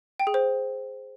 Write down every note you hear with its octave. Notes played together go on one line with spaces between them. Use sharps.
G5
G#4
C5